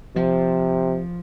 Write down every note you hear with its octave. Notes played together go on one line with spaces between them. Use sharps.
C3 F3